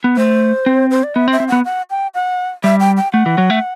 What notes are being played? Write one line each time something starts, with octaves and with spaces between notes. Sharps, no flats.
B3
A3 C5
C4
C5
D5
B3 E5
C4
E5
C4
B3 F#5
F#5
G5
F#5
G3 E5
G5
G5
A3 F#5
E3
F#3
A3